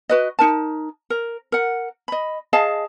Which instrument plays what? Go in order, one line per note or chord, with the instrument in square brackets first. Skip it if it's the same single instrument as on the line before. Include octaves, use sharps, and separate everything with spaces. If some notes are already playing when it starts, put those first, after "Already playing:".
[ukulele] F#4 B4 D#5
D#4 A#4 A5
A#4
A#4 F#5
D#5 B5
G#4 D#5 F5 A5